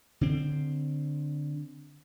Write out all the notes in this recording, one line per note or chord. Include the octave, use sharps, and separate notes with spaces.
D3 C4